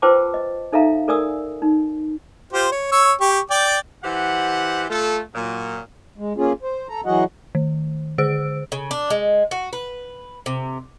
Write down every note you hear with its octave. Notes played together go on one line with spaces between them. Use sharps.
F4 B4 C5 G5 A5 D6
D#5
D#4 A4 E5 F5 A#5
A4 A#4 D5 G#5 D#6 E6
D#4
F4 G4 C5
C#5
C#5 C#6 E6
G4 C#6
D5 G5 D6
E3 G4 C5 F#5
A3 F4 A4
A#2 F#3
G#3
A#3 C#4 F4 G#4
C5
A4 A#5
E3 F#3 F#4 G#4 D#5 F#5
D#3
D3 G#4 C5 E6 D7
C#3
D4
G#3
F#4
B4
C3